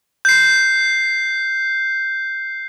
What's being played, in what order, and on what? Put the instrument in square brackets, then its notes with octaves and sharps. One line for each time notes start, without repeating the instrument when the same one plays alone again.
[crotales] G6 C7